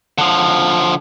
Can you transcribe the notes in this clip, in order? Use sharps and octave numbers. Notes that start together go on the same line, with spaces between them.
D3 F3